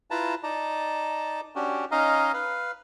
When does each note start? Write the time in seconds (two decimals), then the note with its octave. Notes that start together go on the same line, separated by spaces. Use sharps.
0.11 E4 F4 B4 A5 A#5
0.43 D#4 D5 A5 A#5
1.56 C#4 D4 F#4 G4
1.91 C#4 D#4 D#5 F5 A#5
2.34 B4 F5